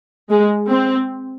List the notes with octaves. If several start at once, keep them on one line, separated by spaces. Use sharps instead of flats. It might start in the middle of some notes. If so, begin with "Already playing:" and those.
G#3
C4